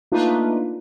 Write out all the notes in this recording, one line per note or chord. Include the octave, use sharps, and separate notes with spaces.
A3 A#3 D4 D#4 F4 B4